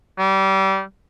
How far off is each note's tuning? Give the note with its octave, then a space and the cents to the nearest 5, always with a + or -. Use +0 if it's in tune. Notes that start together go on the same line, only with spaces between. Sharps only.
G3 -25